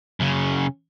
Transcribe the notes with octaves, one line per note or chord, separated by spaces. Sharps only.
F#2 C#3